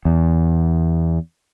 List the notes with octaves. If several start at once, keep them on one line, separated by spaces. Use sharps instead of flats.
E2